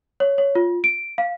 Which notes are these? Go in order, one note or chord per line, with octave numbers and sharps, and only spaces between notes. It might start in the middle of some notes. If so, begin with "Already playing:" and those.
C#5
C#5
F4
D7
F5